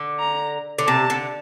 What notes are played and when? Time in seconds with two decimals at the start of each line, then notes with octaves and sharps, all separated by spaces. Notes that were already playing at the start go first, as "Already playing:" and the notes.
Already playing: D3
0.19 A#5
0.78 D3
0.87 C3 A5
1.10 D3